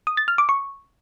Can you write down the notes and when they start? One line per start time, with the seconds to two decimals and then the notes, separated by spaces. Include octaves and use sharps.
0.07 D#6
0.17 A6
0.28 F6
0.38 D6
0.49 C#6